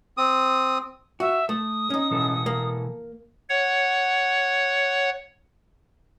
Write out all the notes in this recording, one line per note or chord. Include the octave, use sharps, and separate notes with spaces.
C4 D#6
F#4 E5
A3 D#6
C#4 D#4
B2 E3 A4
A#3
C#5 F#5